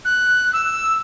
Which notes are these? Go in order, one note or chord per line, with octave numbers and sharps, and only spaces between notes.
F#6
E6